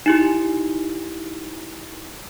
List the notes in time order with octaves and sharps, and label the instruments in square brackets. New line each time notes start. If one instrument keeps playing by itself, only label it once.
[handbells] D#4 E4 G4